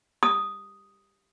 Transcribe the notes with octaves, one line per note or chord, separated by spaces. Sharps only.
D#6